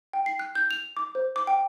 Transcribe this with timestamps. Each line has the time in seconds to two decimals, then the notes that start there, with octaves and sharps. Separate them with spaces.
0.13 G5
0.26 C7
0.39 F#6
0.55 G6
0.71 F7
0.97 D6
1.15 C5
1.36 D6
1.47 G5